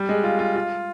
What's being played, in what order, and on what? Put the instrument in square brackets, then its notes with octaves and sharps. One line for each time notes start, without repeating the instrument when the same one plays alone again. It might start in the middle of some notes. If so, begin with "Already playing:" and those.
Already playing: [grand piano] G3
G#3
F4
F4
F4